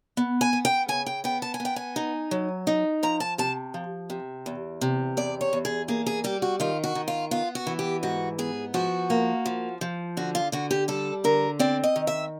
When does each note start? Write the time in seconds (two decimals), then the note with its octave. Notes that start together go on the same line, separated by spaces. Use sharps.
0.17 B3
0.41 G#5
0.53 B3
0.65 G5
0.88 C#3 G#5
1.06 G5
1.24 B3 G5
1.42 A5
1.54 G#5
1.60 B3
1.65 G5
1.76 G#5
1.96 D#4
2.31 F#3
2.67 D#4
3.03 F3 A#5
3.20 A5
3.38 C3 A5
3.74 F3
4.10 C3
4.46 E2
4.81 C3
5.17 E2 D5
5.41 C#5
5.53 E2
5.65 G#4
5.88 A#3 G#4
6.06 G#4
6.24 G3 G4
6.42 F#4
6.60 D#3 F4
6.84 F#4
6.95 D#3
7.08 F4
7.31 B3 F4
7.55 F#4
7.67 E3
7.79 G4
8.03 G#2 F#4
8.38 B3 G#4
8.74 F3 F#4
9.10 A#3
9.46 F3
9.81 F3
10.17 D3 F#4
10.35 F4
10.52 D3 F#4
10.71 G4
10.88 G3 A4
11.24 D3 A#4
11.59 C4 D5
11.83 D#5
11.96 D#3
12.07 E5